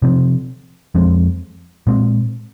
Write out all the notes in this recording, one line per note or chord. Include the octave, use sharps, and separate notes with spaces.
C3 F3 C4
F2 F3 G#3 C4
A#2 G#3 C4